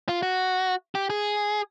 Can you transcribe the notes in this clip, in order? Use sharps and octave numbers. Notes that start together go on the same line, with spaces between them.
F4
F#4
G4
G#4